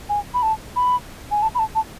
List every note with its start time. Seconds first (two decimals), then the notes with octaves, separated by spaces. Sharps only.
0.09 G#5
0.34 B5
0.43 A5
0.76 B5
1.31 G#5
1.42 A5
1.55 B5
1.59 A5
1.75 A5